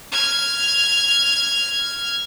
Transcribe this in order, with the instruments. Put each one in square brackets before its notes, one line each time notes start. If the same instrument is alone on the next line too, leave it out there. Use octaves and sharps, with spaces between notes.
[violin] F6 G#6